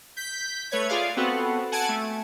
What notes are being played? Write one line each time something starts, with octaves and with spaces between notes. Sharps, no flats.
G6 B6
A3 B4 C#5 G#6
F4 G#4 D5 F5
B3 C4 F#4 A4 F#5
F#5 G#5 A5 G#6 D7 D#7
A3